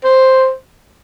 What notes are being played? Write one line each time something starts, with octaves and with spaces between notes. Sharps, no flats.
C5